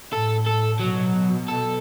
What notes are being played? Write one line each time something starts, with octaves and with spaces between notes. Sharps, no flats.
A2 A4
A4
B2 F#3
A4